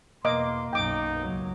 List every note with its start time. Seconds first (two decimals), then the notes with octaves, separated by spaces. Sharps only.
0.25 E2 B2 A#3 D#5 C6 D6
0.73 B1 F#2 D#4 G5 D6
1.22 C#2 F#3